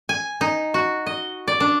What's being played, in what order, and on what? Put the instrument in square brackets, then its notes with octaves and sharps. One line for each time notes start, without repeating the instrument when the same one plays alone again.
[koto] G#5
D#4
F#4
D#5
D5
D4